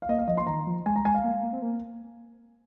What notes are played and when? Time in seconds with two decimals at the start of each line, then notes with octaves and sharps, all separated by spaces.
0.02 F5
0.09 A#3 D#5
0.18 F5
0.28 F3 D#5
0.37 C6
0.47 D#3 A#5
0.67 F3
0.86 G#3 G#5
0.96 A#5
1.04 G#3 G#5
1.14 F5
1.24 A#3
1.43 A#3
1.53 C4
1.62 A#3